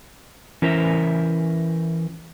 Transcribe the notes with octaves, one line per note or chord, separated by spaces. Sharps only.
E3 C#4 A#4 C5 E5 A#5